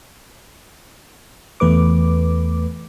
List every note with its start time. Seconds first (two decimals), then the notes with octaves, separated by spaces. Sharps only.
1.60 E2 A3 B4 D6